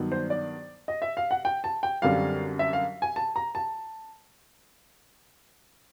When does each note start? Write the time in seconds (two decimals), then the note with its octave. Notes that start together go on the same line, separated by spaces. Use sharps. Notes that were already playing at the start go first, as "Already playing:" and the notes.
Already playing: G2 D#3 F#3 B3
0.12 C5
0.30 D5
0.88 D#5
1.02 E5
1.17 F5
1.31 F#5
1.45 G5
1.64 A5
1.83 G5
2.02 F#2 D3 G3 C4 F5
2.59 E5
2.73 F5
3.02 G#5
3.16 A5
3.36 A#5
3.55 A5